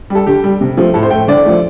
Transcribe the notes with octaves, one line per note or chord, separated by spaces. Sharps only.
G3 A4
D3 G4
G3
C3
F3 A3
A2 A4
C5
A3 G5
D3 D5
F3 A3